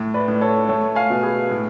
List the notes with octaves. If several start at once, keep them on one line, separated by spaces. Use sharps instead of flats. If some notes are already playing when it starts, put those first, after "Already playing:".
Already playing: A2
B4 D5
A2
A4 C#5
A3 A4 C#5
F5 G#5
B2
G#4 B4
A2